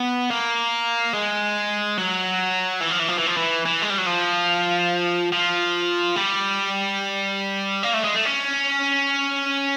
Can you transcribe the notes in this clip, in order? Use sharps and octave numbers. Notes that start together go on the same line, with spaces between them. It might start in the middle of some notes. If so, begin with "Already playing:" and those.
Already playing: B3
A#3
G#3
F#3
E3
F3
E3
F3
E3
F3
E3
E3
G#3
G3
F#3
F3
F3
G3
A#3
A3
G#3
A3
C#4